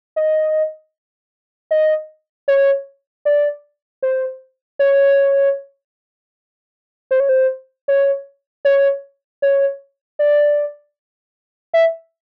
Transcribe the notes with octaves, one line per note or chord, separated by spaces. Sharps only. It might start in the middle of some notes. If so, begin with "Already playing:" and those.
D#5
D#5
C#5
D5
C5
C#5
C5
C#5
C5
C#5
C#5
C#5
D5
E5